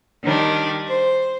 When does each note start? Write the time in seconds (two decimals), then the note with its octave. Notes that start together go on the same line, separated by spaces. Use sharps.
0.24 D#3 G3 D4
0.88 C5